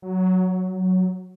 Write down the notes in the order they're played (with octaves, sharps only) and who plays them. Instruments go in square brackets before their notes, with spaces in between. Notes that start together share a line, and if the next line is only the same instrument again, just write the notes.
[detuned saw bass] F#3